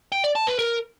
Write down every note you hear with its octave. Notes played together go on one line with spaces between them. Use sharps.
G5
D5
A5
B4
A#4